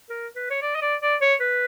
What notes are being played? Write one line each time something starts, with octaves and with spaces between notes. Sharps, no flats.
A#4
B4
C#5
D5
D#5
D5
D5
C#5
B4